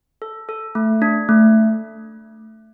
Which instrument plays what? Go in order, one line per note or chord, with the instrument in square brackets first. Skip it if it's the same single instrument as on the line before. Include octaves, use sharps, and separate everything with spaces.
[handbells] A4
A4
A3
D4
A3